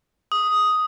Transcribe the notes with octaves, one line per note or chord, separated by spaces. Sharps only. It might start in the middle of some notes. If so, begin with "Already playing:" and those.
D#6